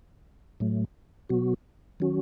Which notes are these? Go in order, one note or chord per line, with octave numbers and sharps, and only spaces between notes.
A2 F#3 A3
B2 F#3 B3 F#4
D#3 F#3 C#4 F#4